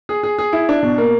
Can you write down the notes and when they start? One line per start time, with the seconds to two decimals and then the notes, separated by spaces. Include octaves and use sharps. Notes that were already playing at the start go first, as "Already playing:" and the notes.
0.09 G#4
0.23 G#4
0.38 G#4
0.53 E4
0.69 D4
0.83 B2
0.98 A#3